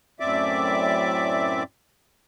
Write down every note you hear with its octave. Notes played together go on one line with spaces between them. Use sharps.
F#2 A2 C4 D5 E5 D6